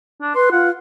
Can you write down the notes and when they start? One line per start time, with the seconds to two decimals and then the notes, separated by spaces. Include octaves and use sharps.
0.21 D4
0.35 B4 C6
0.52 F4 F#5